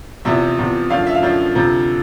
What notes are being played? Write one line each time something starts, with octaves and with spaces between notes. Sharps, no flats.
E2 C3 F3 E5
E2 C3 F3
F#2 D3 F3 F5
E5
F5
F#2 D3 F3
D2 C3 F3